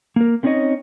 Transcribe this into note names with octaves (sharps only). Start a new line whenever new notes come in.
A#3 A#4
A3 C4 C#4 D#4 C#5 D#5